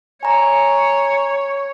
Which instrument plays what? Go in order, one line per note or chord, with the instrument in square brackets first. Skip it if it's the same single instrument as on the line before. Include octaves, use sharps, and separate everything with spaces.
[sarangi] C#5 [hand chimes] G#5 A#5